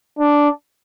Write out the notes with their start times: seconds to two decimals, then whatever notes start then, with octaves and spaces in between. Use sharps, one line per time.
0.19 D4